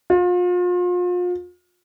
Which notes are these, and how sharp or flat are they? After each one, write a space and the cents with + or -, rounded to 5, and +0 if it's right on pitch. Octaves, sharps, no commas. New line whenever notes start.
F4 +35